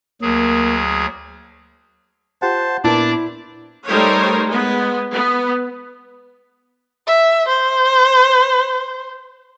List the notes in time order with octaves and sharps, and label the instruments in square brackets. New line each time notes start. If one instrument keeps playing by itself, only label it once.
[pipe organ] D2 F#3 G#4 [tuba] A#3
[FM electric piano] F4 G4 F#5 [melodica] C5 A5
[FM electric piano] A#2 B3 A#4 [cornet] D4 [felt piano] E4 [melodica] A5 D6
[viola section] G3 A3 D#4 A#4 C5 C#5
G#3 B3
B3
[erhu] E5
C5